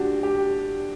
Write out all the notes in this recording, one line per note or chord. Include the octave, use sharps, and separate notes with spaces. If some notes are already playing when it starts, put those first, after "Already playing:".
Already playing: D4 F#4 G4
G4